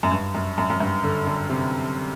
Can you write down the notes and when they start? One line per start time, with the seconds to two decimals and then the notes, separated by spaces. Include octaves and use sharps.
0.03 F#2
0.12 G2
0.35 F#2
0.58 F#2
0.70 F#2
0.80 G2
1.03 D3
1.27 D3
1.49 C3